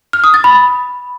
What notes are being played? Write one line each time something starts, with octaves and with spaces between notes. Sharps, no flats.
F6
D#6
A6
B5